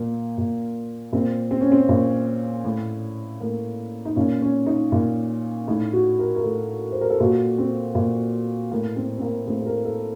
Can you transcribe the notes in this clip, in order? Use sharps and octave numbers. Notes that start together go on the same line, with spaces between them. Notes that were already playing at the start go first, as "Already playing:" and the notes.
Already playing: A#2 A#3
A#2
A#2 C4
C4
C#4
C4
A#2
A2
A2 A#3
D#4
A#2 C#4
C#4
D#4
A#2
A2 D#4
F#4
A#4
A#4
A2 A4
C5
A#4
A4
A#2 F#4
C4
A#2
A2 A#3
C4
C4
A#3
A2 C4
A4
A#4
A4